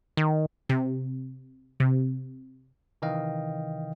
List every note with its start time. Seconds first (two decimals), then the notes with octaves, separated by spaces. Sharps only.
0.17 D#3
0.69 C3
1.80 C3
3.02 C3 D#3 E3 D#5 F5 G5